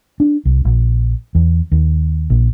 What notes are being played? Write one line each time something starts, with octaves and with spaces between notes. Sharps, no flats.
D4
C2
A#1
E2
D#2
A#1